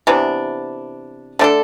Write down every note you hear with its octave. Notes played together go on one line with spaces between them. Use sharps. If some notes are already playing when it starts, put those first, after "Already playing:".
C3 E3 B3 D4
D3 A3 D4 A4